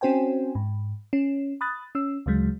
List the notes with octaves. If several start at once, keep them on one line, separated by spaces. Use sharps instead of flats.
C4 C#4 F#4 C5 G5 G#5
G#2
C#4
B5 D#6 F#6 A6
C#4 E6
D2 C#3 F#3 G#3